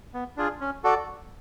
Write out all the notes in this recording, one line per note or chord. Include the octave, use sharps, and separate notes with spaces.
B3
D4 F4 G#4
C#4
F#4 A4 D5